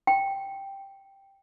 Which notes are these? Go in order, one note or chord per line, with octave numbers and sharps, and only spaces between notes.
G5